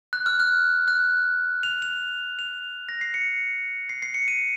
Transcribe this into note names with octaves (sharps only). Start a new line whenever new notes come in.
F#6
F6
F#6
F#6
F7
F7
F7
A#6
C7
C#7
C7
C7
C#7
D#7